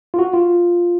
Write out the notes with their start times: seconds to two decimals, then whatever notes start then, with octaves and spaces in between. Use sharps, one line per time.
0.14 F4
0.19 F#4
0.33 F4